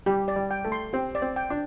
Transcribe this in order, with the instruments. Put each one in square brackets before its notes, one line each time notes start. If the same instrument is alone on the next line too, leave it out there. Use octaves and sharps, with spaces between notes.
[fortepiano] G3 [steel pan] G4
[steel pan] D5
[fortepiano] G3
[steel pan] G5
[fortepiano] A3
[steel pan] C6
[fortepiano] C4 [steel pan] G4
[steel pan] D5
[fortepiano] C4
[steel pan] G5
[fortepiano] D4